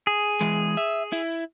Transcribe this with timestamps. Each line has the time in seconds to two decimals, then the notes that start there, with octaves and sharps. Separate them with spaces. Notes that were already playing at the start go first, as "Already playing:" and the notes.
0.07 G#4
0.41 E3 G#3
0.77 E5
1.12 E4